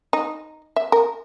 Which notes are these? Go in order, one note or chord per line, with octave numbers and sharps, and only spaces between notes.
D#4
E5
A#4